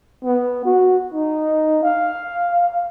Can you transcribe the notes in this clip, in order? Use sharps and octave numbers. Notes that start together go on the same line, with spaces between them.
B3
F#4
D#4
F5